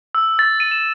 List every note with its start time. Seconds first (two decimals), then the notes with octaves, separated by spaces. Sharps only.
0.15 E6
0.39 A6
0.60 D#7
0.71 E7